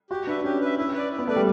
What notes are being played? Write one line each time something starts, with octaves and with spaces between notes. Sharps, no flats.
F#4 G4
D4 B4 E5
C#4 G4
B4 E5
E4
B4 D5
E4
B3
A3 B4 D5
G3